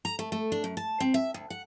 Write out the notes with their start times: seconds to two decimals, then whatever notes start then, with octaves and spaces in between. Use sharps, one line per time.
0.05 A#5
0.19 A3
0.32 A3
0.52 D4
0.64 F#2
0.77 A5
1.00 C4
1.14 E5
1.34 D2
1.50 F#5